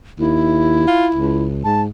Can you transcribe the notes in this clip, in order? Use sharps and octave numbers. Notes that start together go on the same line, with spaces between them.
D#2 E4
F4
C#2
G#2 A5